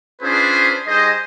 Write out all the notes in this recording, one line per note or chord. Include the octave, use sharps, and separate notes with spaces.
C#4 D4 F4 G#4 B4 C5
G3 D#4 G#4 C5 D#5